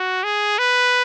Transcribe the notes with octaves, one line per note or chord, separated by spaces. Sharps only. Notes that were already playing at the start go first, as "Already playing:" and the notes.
Already playing: F#4
G#4
B4